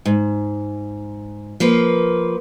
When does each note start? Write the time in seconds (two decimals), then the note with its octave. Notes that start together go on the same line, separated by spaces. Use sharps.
0.05 G#2
1.60 F3 A#3 B4